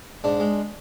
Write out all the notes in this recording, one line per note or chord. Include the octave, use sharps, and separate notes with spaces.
G#2 D4
G#3